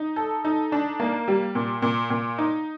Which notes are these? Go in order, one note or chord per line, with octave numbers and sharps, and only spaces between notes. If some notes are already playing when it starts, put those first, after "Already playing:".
Already playing: D#4
A4
D#4
D4
A#3
G3
A#2
A#2
A#2
D#4